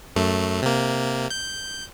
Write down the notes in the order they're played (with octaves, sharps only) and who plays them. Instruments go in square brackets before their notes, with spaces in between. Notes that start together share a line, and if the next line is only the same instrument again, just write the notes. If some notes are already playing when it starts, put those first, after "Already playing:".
[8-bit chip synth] F#2 A3
C3 A#3
G6